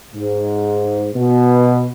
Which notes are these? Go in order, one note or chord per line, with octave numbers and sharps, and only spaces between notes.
G#2
B2